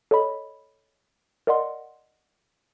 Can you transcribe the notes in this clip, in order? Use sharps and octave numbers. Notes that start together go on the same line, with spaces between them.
A4 C#5 D#5 B5
A#4 D5 D#5 F#5 C6